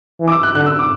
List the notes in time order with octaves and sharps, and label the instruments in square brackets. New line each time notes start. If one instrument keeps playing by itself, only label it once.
[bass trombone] E3
[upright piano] D6
E6
F#6
[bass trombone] D3 [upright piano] F#6
[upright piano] E6
D6